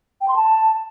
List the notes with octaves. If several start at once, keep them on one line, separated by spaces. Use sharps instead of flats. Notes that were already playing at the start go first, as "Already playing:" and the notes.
G5
C6
A5